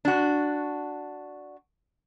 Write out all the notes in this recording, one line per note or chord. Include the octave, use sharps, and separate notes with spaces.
D4 F#4